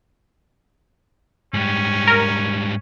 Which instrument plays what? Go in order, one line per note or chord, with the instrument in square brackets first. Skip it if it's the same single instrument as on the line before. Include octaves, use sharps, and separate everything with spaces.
[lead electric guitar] G#2 G3 [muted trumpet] C#4
[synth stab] A#4